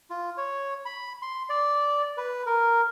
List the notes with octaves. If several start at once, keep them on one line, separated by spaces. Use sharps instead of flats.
F4
C#5
B5
C6
D5
B4
A#4